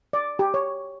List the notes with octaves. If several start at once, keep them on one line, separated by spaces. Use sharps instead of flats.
D5
G4
C#5